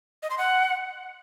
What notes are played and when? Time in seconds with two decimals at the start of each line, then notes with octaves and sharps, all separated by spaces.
0.23 D#5
0.30 C6
0.38 F#5